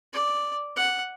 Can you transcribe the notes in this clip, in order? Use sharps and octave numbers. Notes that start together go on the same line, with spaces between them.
D5
F#5